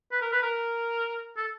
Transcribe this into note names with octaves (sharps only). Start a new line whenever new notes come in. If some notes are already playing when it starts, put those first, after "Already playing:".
B4
A#4
B4
A#4
A4